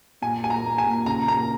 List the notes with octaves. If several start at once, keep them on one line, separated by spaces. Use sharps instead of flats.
A#2 G#5
A#3 G#5
A#5
A#3
G#5
A#2
C#3 A#5
A#3 A#5